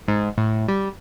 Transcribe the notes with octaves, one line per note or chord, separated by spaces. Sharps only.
G#2
A2
G3